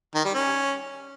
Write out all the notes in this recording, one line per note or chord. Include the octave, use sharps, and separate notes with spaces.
D#3
G3
C#4